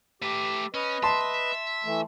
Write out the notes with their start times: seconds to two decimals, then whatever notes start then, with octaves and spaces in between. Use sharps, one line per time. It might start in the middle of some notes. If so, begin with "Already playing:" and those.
0.22 A3 G4 B4
0.74 C#4 B4 D#5
1.03 E5 A5 C6
1.85 E3 A3